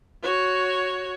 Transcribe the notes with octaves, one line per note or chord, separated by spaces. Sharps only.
F#4 C#5